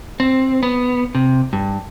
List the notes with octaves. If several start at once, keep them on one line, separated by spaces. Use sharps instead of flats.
C4
B3
C3
G2